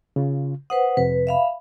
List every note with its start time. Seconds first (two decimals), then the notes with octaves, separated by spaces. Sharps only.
0.16 C#3 F4
0.70 B4 C5 F#5 D#6
0.97 F2 C3 B4
1.27 E5 F5 B5